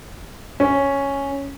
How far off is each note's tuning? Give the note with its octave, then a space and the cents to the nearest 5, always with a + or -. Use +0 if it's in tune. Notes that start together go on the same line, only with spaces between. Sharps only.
C#4 +0